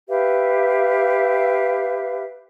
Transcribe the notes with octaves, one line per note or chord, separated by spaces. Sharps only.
G4 B4 E5 F5